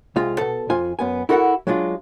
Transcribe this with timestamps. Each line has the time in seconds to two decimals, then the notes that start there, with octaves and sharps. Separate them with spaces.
0.16 C2 G#3 F4 F5
0.38 B2 A4
0.70 F2 F4 G#5
0.99 F#2 B3 G#5
1.29 E4 F#4 A4 A#4 E5 F#5
1.67 F#3 G#3 D4 F4